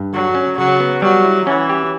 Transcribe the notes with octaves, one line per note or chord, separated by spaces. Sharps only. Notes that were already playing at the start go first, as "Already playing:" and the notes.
Already playing: G2
D3 F#3
C#4
C#3 F#3
B3
F#3 G3
E4
E3 C#4
G4